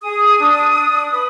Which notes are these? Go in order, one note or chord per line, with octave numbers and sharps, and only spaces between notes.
G#4 D#6
D4
D4
B4